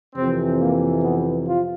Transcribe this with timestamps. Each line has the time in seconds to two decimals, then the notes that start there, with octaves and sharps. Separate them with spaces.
0.15 F2 C3 E3 C4
0.60 A#3
1.02 B3
1.45 F4